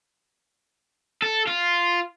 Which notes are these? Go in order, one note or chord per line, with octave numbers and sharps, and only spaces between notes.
A4
F4